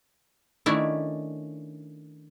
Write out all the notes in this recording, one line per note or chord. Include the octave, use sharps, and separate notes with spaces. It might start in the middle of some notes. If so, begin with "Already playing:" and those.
D#3 A3 C#4 D4 E4